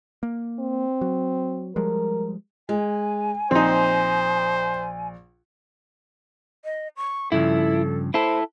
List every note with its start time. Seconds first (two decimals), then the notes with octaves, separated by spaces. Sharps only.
0.23 A#3
0.60 C4
1.01 F#3
1.76 F3 G3 G#3 A#4
2.69 G#3 G#5
3.51 A#1 C4 D#4 C5
6.65 D#5
6.97 C#6
7.32 G2 C#3 F3 E4 A4
8.14 E4 A4 C5 B5